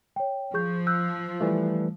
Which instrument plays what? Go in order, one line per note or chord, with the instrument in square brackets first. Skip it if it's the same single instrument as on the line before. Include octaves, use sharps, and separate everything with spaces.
[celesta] C#5 G5
[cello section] F3 [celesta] G#4 C#6 G6
[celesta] E6 F#6 G6
[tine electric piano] E3 G3 A3